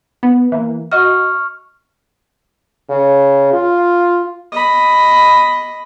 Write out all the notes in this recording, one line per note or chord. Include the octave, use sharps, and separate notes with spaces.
B3
E3 A#3
F#4 D#5 C#6 F6
C#3
F4
D#5 B5